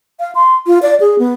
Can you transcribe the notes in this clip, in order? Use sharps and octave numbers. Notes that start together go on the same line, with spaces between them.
F5
C6
F4
D5
G#4
B3